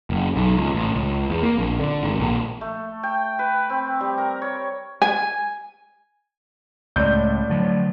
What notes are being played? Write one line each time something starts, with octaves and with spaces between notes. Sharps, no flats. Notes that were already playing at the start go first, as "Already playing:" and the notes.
F#1
B1
C#2
A1
C#2
E2
A#3
A#1
D3
G#1
A#1
A3
G5
B4
C4
G3
A#4
C#5
G#5
C#2 A2 D5 G6
D3 F3 F#3